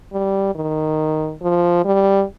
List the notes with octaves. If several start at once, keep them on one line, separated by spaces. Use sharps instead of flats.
G3
D#3
F3
G3